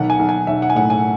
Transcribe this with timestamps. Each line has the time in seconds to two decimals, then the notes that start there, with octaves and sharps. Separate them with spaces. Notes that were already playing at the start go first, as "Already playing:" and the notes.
Already playing: B1 D#3 F#5
0.10 G#5
0.19 B1
0.29 G#5
0.47 B1 E5
0.62 F#5
0.70 G#5
0.75 A2 F#5
0.90 G#5